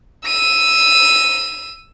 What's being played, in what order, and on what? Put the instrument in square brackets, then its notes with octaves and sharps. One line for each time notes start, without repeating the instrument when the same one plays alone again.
[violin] E6 D#7